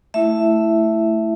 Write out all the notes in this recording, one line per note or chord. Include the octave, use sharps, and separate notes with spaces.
A3 E4 E5